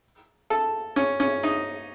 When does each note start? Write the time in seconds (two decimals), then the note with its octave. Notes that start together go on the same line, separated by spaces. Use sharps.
0.50 A4
0.96 C#4
1.20 C#4
1.43 D#4